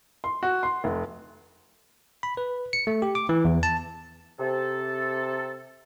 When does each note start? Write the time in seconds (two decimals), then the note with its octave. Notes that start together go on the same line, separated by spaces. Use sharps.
0.24 C6
0.43 F#4
0.63 C6
0.84 F1
2.23 B5
2.37 B4
2.73 C#7
2.87 A3
3.02 G4
3.15 D6
3.29 E3
3.45 E2
3.63 A5
4.39 C3 A4